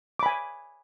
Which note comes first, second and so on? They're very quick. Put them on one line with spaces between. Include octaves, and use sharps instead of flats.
D6 B5 G#5